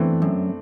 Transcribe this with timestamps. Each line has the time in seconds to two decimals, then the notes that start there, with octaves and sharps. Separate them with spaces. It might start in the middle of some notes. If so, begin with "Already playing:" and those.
Already playing: E3 A3 B3 C4 D4
0.22 F#2